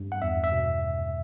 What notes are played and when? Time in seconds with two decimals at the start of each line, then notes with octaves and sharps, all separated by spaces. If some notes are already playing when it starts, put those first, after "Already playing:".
Already playing: G2
0.12 F#5
0.22 E2 E5
0.44 E5
0.52 B2